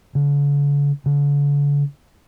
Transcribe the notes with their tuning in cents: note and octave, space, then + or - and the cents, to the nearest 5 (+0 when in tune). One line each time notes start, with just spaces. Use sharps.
D3 -45
D3 -40